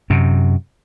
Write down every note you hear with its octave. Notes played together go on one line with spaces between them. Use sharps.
F#2 C3